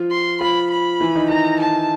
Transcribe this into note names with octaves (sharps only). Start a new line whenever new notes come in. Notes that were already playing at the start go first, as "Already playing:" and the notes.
Already playing: F3 F4
C6
F3 F4 B5
B5
E3 E4
D#3 D#4
D#3 D#4 A#5
A5